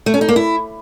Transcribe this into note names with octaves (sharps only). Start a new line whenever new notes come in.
A3
C#4
D#4
A#3
E4